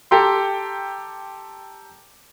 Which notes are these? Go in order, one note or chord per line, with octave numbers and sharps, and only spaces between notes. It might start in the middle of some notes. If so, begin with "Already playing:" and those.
G4 A4 G5 A#5 C6